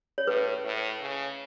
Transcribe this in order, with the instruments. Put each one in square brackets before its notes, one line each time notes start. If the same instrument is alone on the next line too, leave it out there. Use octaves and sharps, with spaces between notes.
[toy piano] C#5
[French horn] A2 [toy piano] B4
[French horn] A2
C#3